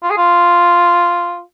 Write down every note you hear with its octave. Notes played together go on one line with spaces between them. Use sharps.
F4
G#4
F4